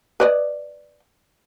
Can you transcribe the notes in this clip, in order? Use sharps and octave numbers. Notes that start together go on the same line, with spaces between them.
B4 D5 D#5